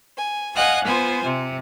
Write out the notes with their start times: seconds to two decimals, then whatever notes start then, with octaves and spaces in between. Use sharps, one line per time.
0.16 G#5
0.55 D#5 F5 F#5 G#5 F#6
0.84 B3 F4 C5 G#5
1.26 C3